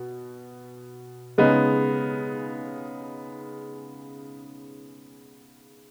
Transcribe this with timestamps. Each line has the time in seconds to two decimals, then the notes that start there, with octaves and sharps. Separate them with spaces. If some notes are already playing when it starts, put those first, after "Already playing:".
Already playing: B2
1.38 C#3 G#3 B3 D#4